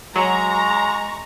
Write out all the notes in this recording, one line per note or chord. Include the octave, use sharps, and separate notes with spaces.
F#3 G#3 A#5 C#6